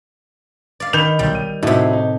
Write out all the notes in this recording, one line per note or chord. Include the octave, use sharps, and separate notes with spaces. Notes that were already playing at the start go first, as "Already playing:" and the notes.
D5 F5
D#3 B5 G6 F7
B1 G3
D#7
A2 C3 D#4 E4 F#4
D#4